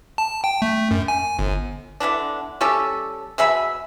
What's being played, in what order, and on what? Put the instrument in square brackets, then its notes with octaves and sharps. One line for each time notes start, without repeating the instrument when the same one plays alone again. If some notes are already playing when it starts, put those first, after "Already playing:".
[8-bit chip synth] A5
G5
A3
F#2
G#5
G1
[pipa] D3 E3 B3 D4
G3 C#4 G4 A4
B2 G#4 E5 B5